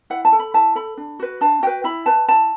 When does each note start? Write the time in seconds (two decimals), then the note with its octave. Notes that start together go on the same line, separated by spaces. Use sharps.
0.10 E4 F#5
0.25 A5
0.32 A4
0.39 B5
0.54 E4 A5
0.75 A4 B5
0.97 D4
1.19 F#4 B4
1.41 D4 A5
1.63 F#4 B4 G5
1.84 E4 B5
2.06 B4 A5
2.28 E4 A5